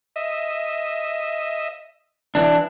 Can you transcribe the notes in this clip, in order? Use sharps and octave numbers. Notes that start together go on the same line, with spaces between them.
D#5 E5
E3 D4